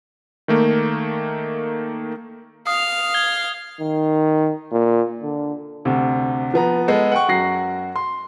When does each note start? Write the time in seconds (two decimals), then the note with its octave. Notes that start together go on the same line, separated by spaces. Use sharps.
0.48 D#3 A3 A#3
2.67 F5 D#6
3.14 G#6 G7
3.80 D#3
4.71 A#2
5.23 D3
5.85 D2 C3
6.54 F3 B3 A#5
6.88 G#3 B3 A4
7.11 F#5 G5 C#6
7.28 F#2 F#4 A#6 C7
7.96 C6